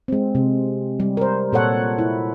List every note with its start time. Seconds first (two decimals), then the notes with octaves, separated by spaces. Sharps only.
0.08 G#3 C4
0.35 C3
1.00 G3
1.17 A#4 C5
1.53 A#2 A4 C#5 F#5
1.98 E4